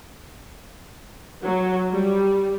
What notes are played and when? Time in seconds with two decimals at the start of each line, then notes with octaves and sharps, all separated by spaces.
1.44 F#3
1.91 G3